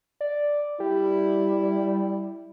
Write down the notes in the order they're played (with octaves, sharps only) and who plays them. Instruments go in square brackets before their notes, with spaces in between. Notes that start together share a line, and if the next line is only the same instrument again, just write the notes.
[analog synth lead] D5
[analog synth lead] G3 [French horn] E4